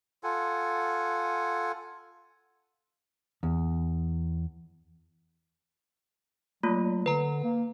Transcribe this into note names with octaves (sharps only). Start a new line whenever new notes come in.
F4 A4 F#5 G#5
E2
F#3 A3 A#3 F4
D3 B4 A#5
A#3